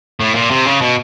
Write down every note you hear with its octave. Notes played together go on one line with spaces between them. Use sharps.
A2
A#2
C3
C#3
B2